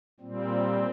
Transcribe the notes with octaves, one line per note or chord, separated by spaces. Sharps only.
A#2 G3 C4